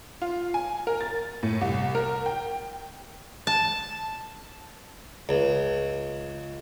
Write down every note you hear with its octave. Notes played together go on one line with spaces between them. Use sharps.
F4
G#5
A#4
A6
A2
C2
A#4
G5
A5
C#2